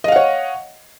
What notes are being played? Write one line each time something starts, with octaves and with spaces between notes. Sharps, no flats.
C#5 D#5 F5 F#5